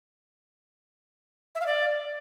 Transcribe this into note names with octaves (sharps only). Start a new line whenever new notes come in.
E5
F5
D5